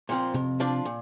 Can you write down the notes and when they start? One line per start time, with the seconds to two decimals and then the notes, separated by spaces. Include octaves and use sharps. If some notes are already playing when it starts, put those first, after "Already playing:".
0.09 A#2 F3 C4
0.34 F2 C3
0.60 F3 D4 F4 D5
0.85 A#2